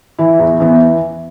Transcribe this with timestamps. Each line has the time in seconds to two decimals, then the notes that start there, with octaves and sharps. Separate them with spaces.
0.18 E3 E4
0.39 E2
0.60 E3 B3